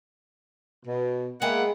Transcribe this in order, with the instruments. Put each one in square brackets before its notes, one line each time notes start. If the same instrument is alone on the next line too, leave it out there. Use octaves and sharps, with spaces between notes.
[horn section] B2
[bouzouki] G#3 B3 G5 [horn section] A#3 E5 F#5